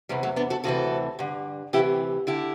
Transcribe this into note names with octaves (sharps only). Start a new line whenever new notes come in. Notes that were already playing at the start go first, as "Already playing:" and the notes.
E2 C3 E3 G3
F#3 A3
B3 D4
F#4 A4
D2 C3 E3 F#4 A4
G2 D3
D2 C3 E3 E4 G4
D3 E4 G4